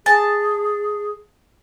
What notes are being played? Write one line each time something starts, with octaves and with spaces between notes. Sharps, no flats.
G#4 G#5 A5